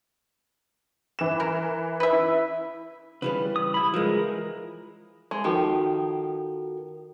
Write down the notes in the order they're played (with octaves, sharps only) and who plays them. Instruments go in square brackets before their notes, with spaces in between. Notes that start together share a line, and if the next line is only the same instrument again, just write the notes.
[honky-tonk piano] E3 E7
[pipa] A#4
B4 E5
[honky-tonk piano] E4
[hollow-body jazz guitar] C#3 E3 G3 [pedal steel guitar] B4
[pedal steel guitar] D#6
E4 B5
[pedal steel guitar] E3 A#4 [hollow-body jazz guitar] F3 G#3
[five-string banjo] G#3
[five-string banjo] D#3 F3 G4 [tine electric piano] F#4 A4 A#4